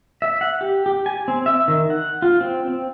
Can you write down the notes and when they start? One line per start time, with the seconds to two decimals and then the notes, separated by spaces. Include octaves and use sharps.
0.22 E5
0.41 F#5
0.61 G4
0.86 G4
1.06 G#5
1.28 C4
1.46 E5
1.68 D#3
1.90 F#5
2.22 F4
2.41 C4
2.68 C4